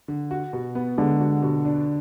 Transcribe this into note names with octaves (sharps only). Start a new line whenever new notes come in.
D3
F#4
B2
B3
D3 G#3
F#4
B2
D4